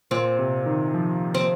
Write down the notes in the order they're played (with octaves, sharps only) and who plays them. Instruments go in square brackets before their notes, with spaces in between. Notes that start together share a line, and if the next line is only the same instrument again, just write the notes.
[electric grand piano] A#2 [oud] C4
[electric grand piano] C3
D#3
F3
[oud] C4